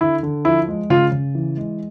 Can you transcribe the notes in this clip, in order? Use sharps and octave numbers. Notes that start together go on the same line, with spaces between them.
D3 E4
D3
F3 E4
G#3
C#3 F4
C#3
E3
G#3